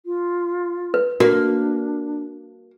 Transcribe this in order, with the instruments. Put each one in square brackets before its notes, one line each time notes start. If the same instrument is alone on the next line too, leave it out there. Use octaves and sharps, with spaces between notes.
[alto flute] F4
[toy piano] B4
[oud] A#3 [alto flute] D4 [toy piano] F#4